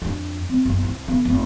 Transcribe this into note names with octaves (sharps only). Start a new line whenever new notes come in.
F2 D4
C4
F#1 B1
C2
D3 B3
F1 C4